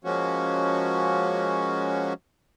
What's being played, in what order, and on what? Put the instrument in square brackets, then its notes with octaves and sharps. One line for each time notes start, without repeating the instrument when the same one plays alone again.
[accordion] F3 G#3 A#3 C#4 F#4